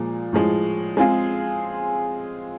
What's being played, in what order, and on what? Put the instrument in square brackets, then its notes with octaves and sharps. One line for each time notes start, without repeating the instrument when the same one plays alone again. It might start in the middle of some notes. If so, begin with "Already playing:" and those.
Already playing: [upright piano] A#2 F3 G#3
A2 F3 G#3
G#3 C4 F4 G#4